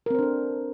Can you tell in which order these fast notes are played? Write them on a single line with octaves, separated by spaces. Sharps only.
A#4 C4 C5 D4 A4